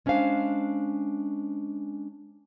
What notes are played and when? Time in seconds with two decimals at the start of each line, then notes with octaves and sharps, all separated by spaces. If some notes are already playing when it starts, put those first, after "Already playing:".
0.06 G#3 C#4 D4 C5 F5